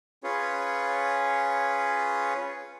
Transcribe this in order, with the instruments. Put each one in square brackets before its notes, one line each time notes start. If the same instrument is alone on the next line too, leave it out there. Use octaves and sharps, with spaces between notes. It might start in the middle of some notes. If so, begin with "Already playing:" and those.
[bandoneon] C#4 F4 G#4 B4 C#5